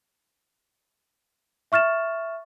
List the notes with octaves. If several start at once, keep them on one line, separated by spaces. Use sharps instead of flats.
E5 C#6 F6 A6 E7